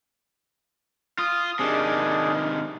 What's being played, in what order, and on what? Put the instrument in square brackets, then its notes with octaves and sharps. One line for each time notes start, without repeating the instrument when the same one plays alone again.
[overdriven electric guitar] F4 [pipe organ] D#6
[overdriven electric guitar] C3 D#3 [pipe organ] D4 G#4